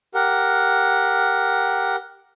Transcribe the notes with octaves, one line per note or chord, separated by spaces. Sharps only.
G4 A#4 F#5